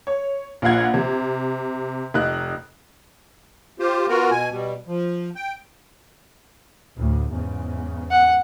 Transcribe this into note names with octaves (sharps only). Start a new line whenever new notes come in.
C#5
A#1 F4 F5 F#5 G#6
C3
F1 D#4 F#6
F4 G4 C5
B3 F4 F#4 A#4
B2 G#5
B2 G3
F3
G5
D2 A2
E2 G#2 C#3
F#5